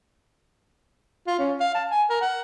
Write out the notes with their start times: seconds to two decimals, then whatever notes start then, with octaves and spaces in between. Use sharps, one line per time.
1.27 F4
1.39 C#4
1.61 F5
1.75 A5
1.91 G#5
2.10 A#4
2.21 F#5